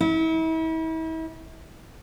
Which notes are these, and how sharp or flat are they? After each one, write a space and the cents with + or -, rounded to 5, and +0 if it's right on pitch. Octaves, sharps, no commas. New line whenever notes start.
E4 -40